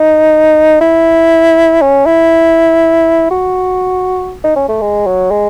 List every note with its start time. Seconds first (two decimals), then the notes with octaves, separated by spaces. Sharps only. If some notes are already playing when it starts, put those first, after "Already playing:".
Already playing: D#4
0.81 E4
1.81 C#4
2.06 E4
3.31 F#4
4.44 D#4
4.56 C#4
4.68 A3
4.81 G#3
5.07 F#3
5.31 G#3